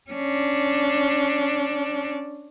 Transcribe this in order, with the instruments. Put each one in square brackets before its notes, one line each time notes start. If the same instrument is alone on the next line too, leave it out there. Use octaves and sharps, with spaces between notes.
[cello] C#4 D4